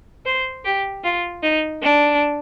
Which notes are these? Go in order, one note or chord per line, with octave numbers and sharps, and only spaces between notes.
C5
G4
F4
D#4
D4